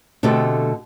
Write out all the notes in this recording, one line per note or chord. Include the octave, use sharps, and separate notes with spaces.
B2 D3 A3 C4 G4 A4